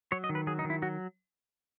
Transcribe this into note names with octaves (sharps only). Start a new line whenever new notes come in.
F#3 C#5
D#5
D#3
B4
F#3 G#4
D#4
D#3
E4
F#3 F#4